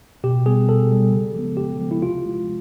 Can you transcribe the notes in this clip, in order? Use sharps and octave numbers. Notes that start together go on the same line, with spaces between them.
B2 G4
G3 B3 G#4
B2 A4
G3 B3
C#3
F3 G#3 B3
C#3 G4
F3 G#3 B3
E4
C3 F4
F3 G#3